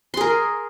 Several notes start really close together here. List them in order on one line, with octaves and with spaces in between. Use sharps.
C6 G#4 A#4